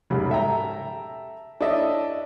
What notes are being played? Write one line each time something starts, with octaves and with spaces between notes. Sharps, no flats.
E1 G#2 C#3 G3 B5
A4 E5 G5 A#5
D4 E4 A4 C#5 D#5 E5